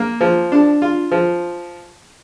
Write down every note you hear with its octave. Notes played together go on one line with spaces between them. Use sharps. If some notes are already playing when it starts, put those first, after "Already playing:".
Already playing: A#3
F3
D4
F4
F3